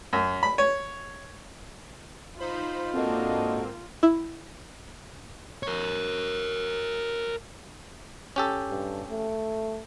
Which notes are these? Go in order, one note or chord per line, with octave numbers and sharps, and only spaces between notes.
F#2
B5
C#5
D#4 F4 C5 B5
G#2 A#3 C4 D4 F#4 A4 D#5
E4
A#4 C#5
C#4 G4 A4
G2
A3